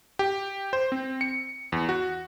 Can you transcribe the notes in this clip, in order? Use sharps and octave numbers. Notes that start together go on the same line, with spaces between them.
G4
C5
C4
C#7
E2
F#4